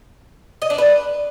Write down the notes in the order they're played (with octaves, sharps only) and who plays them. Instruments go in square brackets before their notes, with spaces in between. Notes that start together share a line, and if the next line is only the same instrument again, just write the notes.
[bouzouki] D#5
D4
B4